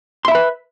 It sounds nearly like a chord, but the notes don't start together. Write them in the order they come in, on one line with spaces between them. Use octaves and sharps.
C6 E5 B5 B4